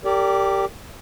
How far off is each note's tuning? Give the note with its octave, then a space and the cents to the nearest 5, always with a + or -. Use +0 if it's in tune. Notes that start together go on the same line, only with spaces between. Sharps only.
G4 +0 A#4 -30 D5 -25